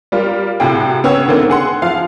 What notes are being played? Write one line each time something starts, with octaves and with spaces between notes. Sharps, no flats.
G3 F4 A#4
A2 C3 F#4 G#4 G5
C#3 B3 C#5 F#5 G5 E6
D3 D#3 A3 A#3 C4
G#4 F#5 C6
F3 F5